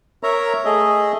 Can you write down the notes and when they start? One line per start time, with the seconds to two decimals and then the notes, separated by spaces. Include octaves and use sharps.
0.23 A#4 C#5 E5 A#5
0.65 A3 G#4 D#5 E5